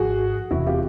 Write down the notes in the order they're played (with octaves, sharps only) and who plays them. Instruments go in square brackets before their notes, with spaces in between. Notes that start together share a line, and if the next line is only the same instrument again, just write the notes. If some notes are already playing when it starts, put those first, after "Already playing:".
Already playing: [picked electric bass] G#1 G#2 F3 [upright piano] F#4 G#4
[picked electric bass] E1 E2 C3 [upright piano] E4 F#4
[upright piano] F4 G4